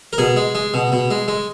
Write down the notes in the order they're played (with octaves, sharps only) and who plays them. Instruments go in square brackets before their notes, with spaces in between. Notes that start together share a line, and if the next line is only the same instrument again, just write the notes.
[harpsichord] A#4
B2 G#4
G#3
G#3
B2
B2
G#3
G#3